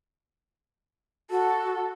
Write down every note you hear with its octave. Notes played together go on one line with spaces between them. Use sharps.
F#4 A4